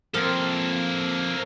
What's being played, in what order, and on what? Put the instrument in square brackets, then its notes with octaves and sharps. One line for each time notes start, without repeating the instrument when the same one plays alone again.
[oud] F3 C4 A#4 [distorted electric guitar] A#3 A4